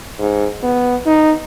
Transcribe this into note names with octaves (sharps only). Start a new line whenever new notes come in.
G#2
B3
D#4